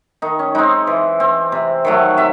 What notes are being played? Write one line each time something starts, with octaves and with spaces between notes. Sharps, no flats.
D#3 D#4
C#4
G#3 C4 D#4
E3
C4
C3
D#3 F#3 A3
C3 E5